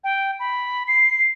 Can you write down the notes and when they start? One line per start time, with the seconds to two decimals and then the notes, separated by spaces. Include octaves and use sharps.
0.04 G5
0.40 B5
0.88 C7